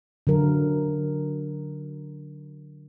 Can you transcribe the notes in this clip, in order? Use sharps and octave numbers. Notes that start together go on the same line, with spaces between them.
D3 F#3 A#4